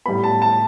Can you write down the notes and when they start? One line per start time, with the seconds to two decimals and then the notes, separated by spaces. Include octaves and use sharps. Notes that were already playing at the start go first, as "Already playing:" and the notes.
0.06 A2 G3 B3 B5
0.24 A5
0.42 A5